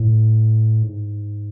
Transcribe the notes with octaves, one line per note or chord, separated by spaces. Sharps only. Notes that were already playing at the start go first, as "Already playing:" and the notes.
Already playing: A2
G#2